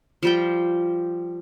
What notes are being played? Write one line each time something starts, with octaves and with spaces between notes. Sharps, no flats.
F3 G3 G5